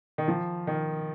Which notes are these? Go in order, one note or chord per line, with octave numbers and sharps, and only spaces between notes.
D#3
F3
D#3